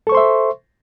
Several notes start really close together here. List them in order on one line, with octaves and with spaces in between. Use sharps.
A4 C#6 C5 C6 E5